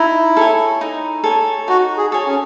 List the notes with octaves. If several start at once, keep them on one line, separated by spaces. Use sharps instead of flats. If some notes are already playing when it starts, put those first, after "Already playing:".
Already playing: D#4 E4
A4 C#5 G#5
D#4
A4 C#5 G#5
D#4 F#4
G#4
A4 C#5 G#5
C#4